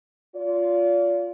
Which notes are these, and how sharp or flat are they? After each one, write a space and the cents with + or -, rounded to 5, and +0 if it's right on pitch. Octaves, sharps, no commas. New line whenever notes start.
F4 +0 D5 -40